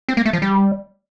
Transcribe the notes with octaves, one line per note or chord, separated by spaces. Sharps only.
C4
A#3
A3
F3
G3